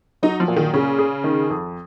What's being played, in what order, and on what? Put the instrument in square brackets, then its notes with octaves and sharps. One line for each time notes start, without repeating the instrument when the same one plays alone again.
[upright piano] F#3 [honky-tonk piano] D#4
[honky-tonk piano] F3
[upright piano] A#2
[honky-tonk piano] D#3
[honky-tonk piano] C#3 [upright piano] C#4
[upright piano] G#4
D#3
F2